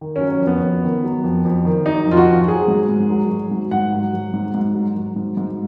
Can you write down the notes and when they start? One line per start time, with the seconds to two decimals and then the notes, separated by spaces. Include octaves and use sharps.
0.01 D#3
0.16 C#4
0.21 F#3
0.32 C#4
0.41 F2
0.47 B3
0.63 F2
0.84 D#3
1.04 F#3
1.24 F2
1.45 F2
1.65 D#3
1.86 F#3 D#4
2.07 F2 F4
2.17 F#4
2.27 F2
2.48 F#3 G#4
2.68 G#2
2.89 G#2
3.10 F#3
3.30 F#3
3.51 G#2
3.71 G#2 F#5
3.93 F#3
4.13 F#3
4.33 G#2
4.54 G#2
4.75 F#3
4.95 F#3
5.16 G#2
5.37 G#2